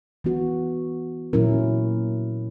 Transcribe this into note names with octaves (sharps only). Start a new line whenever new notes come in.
E3 B3 F#4
A#2 F#3 C#4 E4 A#4